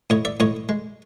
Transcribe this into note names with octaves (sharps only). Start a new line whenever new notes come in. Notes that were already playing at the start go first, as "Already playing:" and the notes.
A2 C#5 D#5
D5 E5
A2 C#5 D#5
G#3